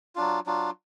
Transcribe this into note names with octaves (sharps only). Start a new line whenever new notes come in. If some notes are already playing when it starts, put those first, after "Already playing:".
F#3 D4 F4
F#3 D4 F4